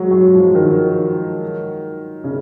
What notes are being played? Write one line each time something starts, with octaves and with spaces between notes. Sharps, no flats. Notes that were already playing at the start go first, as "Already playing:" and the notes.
Already playing: F#3 G#3
F#3
F3
D#3
C#3